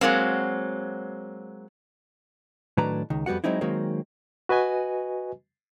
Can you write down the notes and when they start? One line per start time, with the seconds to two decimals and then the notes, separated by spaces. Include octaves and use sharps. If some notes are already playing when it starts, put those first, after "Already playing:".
0.01 F#3 G#3 A#3 C4
2.77 A2 D#3 F#3 D4 B4 A#5
3.10 C#2 D#3
3.26 F2 G3 B3 F#4 F#5
3.44 F#3 G#3 C4 D#4 E4
3.61 D#3 F#3 G#3 A#3 C4
4.49 F#4 B4 D#5 G#5